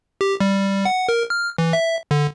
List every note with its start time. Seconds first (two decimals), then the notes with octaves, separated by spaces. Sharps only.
0.21 G4
0.40 G3
0.85 F#5
1.09 A#4
1.30 F6
1.58 E3
1.73 E5
2.11 D3